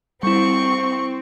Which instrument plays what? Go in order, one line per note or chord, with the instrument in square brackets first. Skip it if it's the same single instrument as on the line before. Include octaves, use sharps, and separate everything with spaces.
[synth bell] G3 E4 [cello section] C4 [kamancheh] C#6